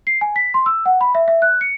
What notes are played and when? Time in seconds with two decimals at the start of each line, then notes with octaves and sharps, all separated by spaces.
0.07 C7
0.21 G#5
0.36 B6
0.54 C6
0.66 E6
0.86 F#5
1.01 B5
1.15 E5
1.28 E5
1.42 F#6
1.61 C#7